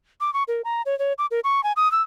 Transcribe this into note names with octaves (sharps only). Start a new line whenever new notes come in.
D6
C#6
A#4
A#5
C#5
C#5
D6
A#4
C#6
G#5
D#6
E6